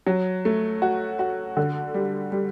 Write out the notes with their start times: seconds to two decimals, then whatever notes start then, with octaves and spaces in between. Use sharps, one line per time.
0.07 F#3
0.45 A3
0.82 F#4
1.19 F#4
1.57 D3
1.94 G3
2.32 G3